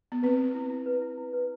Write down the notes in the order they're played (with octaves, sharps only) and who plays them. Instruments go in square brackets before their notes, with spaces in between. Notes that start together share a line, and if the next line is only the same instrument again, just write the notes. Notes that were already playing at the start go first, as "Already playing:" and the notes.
[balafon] B3
[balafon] C4 [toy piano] B4
[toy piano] B4
E4
E4
B4
E4
E4
B4